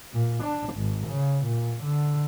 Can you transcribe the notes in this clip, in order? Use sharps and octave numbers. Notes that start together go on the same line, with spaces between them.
A#2
D4
G#1
C#3
A#2
D3